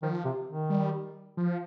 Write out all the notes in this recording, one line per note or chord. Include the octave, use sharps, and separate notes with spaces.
D#3 F3
C3
D#3
G3
F3